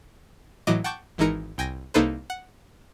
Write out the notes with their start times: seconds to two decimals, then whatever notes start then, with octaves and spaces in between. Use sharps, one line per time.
0.67 A2 E3 F#3 D#5 D6
0.84 F#5 G5 A5 C#6 D6 G6
1.18 G#1 E3 G#3 D#4 A#4 C#7
1.58 C2 G5 G#5 A#6
1.94 C2 A#3 D#4 A4 B4 C5
2.30 F#5